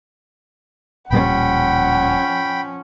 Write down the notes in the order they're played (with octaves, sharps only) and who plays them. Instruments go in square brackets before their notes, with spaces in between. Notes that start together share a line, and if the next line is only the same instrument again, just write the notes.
[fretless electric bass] D1 A#2 G3 [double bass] F3 C#4 [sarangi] F#5 [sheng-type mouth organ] G5 B5